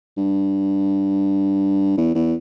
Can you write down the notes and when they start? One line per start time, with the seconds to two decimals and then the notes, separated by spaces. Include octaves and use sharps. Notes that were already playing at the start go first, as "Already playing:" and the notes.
0.17 G2
1.97 E2
2.15 E2